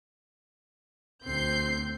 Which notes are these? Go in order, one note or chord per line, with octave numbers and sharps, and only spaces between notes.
D2 C4 G6 C7